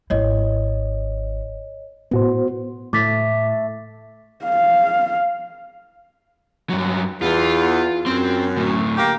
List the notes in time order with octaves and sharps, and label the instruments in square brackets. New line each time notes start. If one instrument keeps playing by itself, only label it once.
[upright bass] G#1 E4 [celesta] C#5 D#5
[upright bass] A2 [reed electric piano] B3 F#4 C5
[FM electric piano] A2 [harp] A3 [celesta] D6 A6 B6
[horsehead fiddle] F5
[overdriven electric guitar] G2 F#3
[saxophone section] E2 [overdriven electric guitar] F4
[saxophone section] F#2 [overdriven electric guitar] C4 C6
[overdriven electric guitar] D2 A2
[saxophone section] A#3 G4